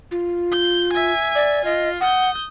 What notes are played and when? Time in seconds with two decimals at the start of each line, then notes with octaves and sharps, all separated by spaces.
0.11 F4
0.51 G6
0.93 E5 G#5
1.35 D5
1.65 F4 D#5
2.01 F#5 D#6 G6